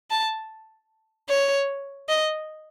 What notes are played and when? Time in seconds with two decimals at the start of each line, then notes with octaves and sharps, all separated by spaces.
0.10 A5
1.29 C#5
2.09 D#5